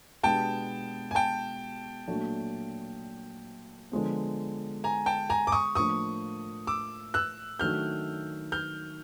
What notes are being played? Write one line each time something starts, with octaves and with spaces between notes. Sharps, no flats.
B2 G#3 B3 D4 G4 G5 A5
G#5
G5 A5
A#2 F#3 A3 D4
D3 F3 G#3 B3
G#5 A#5
G5 A5
G#5 A#5
D6
C#6 D#6
A2 F3 A#3 D4 C#6 D#6
D6 E6
E6 F#6
D#3 F#3 A3 D4 F#4 F6 G6
F6 G6